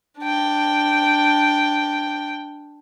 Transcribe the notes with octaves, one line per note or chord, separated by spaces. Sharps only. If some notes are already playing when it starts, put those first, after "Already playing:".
D4 G5